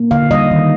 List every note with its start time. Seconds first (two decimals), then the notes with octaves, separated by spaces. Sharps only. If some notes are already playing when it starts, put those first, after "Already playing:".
Already playing: A#3
0.11 D3 F5
0.31 G3 D#5
0.51 D#3